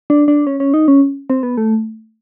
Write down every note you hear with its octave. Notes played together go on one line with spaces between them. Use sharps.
D4
D4
C#4
C#4
D#4
C#4
C4
B3
A3